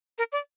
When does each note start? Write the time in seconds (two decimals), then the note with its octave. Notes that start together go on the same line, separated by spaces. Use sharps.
0.18 A#4
0.32 D5